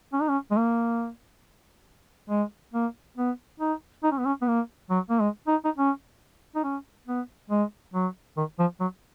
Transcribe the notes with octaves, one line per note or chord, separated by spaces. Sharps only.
C#4
D#4
C#4
G#3
A#3
G#3
A#3
B3
D#4
D#4
C#4
B3
C#4
B3
A#3
F#3
A#3
G#3
D#4
D#4
C#4
D#4
C#4
B3
G#3
F#3
D#3
F3
F#3